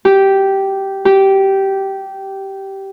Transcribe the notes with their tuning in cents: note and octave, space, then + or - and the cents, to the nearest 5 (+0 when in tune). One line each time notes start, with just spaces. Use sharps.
G4 -10
G4 -15